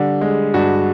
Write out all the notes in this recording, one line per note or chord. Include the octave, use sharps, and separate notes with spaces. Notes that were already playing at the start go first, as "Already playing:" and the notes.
Already playing: D3 G3
G#3
G2 F#4